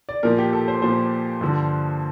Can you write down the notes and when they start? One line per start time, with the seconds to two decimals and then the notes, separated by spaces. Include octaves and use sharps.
0.09 D5
0.23 A#2 F3 A#4
0.38 G4
0.53 A4
0.68 C5
0.82 A#2 F3 C5
1.41 G2 D3 F3